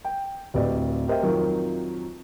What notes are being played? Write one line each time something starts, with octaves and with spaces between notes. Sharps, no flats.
G5
D1 C4 G4 B4 D5 D#5
G4 A#4 C5 D#5 E5 G5
F2 D#3 F3 F#3